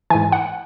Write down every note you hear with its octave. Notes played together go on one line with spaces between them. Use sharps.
G#2 E3 G#5
F#5